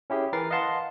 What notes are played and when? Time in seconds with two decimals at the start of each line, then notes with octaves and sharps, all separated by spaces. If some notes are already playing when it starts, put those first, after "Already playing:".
0.10 C#4 E4 G4 G#4
0.33 E3 A#4 B4 A6 C7
0.51 D#5 F5 F#5 A5 C6